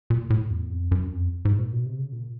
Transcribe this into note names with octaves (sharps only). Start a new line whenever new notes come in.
A#2
A2
E2
F2
F#2
F2
G#2
A#2
B2
C3
C#3
A#2